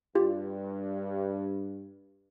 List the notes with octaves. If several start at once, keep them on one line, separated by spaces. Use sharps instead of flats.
G2 F4 G4